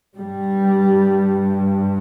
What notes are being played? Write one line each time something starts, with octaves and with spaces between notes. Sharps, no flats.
G2 G3